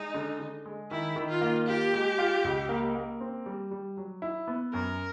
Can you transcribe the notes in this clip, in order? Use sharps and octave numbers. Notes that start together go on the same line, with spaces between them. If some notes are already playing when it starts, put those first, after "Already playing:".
Already playing: G#3 D#4
D3
D3
G#3
D#3 E4
D#3
F4
A#3
F4 G4
G#3
F4
C#2
A#3
A#3
C4
G3
G3
F#3
E4
B3
F#2 A#4